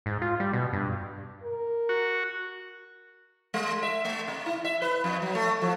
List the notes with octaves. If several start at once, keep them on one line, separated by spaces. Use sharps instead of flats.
G#2
F4
G3
B2
G2
A#4
F#4
G#3
E5
A3
C3
E4
E5
B4
F2
F#3
A3
F3